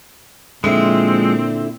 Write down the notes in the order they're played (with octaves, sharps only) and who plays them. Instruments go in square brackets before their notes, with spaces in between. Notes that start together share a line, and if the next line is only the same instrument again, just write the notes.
[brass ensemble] A#2 [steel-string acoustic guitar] D3 E4 [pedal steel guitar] F3 G#3 [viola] C4